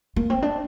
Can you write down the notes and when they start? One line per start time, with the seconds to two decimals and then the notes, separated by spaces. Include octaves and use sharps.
0.16 A#3
0.30 C4
0.42 D4